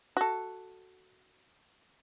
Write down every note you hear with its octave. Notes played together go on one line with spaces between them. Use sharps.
F#4 A4